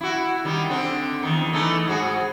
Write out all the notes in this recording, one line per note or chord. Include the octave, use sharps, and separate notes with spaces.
E4 F#4
D#3 G3
D3 C4 D4
E2 D#3
E3 A3 D#4
G#2 F#4 G#4